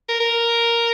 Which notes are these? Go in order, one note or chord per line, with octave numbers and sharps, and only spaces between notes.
A#4
A#4